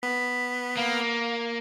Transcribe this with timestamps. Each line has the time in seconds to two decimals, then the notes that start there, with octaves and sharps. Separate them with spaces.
0.03 B3 B6
0.77 A#3 F5